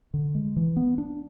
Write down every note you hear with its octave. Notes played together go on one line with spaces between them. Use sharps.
D3
G#3
E3
B3
D4